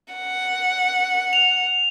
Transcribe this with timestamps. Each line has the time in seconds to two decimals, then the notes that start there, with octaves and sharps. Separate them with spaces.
0.14 F#5
1.33 F7